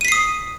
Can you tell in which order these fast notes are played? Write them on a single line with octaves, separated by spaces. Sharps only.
D#7 B6 C7 D#6